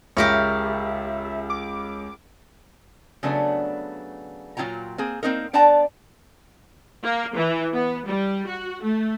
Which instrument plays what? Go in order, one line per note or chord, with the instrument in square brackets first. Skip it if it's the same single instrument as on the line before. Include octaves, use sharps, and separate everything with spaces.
[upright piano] C#2 [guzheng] G4 A#4 C#5 [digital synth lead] E5
[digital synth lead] D6
[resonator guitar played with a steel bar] C#3 F#3 A3 B3 D4
A#2 F#3 E4 F4 G5 A#5
A#3 C4 G#4
A#3 C4 D#4 A#4
B3 D4 D5 G5 A5 A#5
[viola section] A#3
E3
B3
G3
F#4
A3